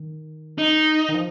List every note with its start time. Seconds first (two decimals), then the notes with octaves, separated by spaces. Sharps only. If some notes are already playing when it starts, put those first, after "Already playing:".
Already playing: D#3
0.58 D#4
1.09 D#3
1.14 F3